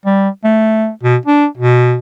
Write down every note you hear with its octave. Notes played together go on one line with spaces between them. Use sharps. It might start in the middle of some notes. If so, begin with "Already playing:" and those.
G3
A3
B2
D4
B2